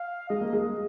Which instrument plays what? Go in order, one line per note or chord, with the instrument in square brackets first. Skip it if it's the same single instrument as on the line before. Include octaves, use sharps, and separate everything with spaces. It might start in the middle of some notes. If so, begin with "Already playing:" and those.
Already playing: [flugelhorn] F5
[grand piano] G#3 [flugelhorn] D#5
[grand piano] A#3
G#3